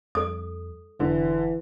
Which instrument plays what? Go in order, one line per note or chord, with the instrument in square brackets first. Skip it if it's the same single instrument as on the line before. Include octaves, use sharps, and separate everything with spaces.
[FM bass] F2 [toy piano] A4 D#6
[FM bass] F1 [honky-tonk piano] D3 [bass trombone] E3